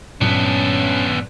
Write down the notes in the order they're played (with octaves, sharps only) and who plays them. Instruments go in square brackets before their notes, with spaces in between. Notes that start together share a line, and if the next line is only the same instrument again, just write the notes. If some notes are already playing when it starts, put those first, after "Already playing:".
[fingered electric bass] G2 A#2 F#3 [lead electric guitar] B3 D4 [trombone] C#4